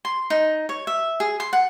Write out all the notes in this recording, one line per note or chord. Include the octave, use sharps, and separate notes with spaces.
C6
D#4
C#5
E5
G#4
C6
F#5